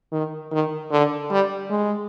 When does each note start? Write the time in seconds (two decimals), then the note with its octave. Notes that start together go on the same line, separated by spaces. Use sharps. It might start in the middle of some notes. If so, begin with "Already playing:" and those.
0.12 D#3
0.51 D#3
0.91 D3
1.30 G3
1.70 G#3